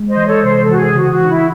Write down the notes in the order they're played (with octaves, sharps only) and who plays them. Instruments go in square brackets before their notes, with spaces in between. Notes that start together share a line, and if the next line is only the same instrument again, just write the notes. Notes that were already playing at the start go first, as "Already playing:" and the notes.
Already playing: [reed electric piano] G#3
[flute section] C5 D#5
[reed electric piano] E3
[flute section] A4 C#5
[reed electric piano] C3 [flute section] C5
[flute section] A4
[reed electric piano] E3 [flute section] F#4
[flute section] G#4
[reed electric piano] C#3 [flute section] F#4
[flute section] F#4
[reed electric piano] E3 [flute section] D#4
[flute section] E4